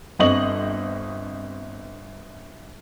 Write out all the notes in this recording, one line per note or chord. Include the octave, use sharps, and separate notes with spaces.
G1 C4 D#5 C#6 F#7